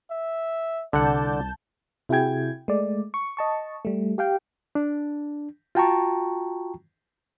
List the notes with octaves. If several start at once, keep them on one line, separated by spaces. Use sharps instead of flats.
E5
C2 D3 D5 F#5 A5 G6
C3 E4 F#4 G#4 G5 G#6
G#3 A3 D5
C#6
D#5 A5 C#6
G3 A3
G4 F5 G5
D4
F4 F#4 G5 A5 A#5 C#6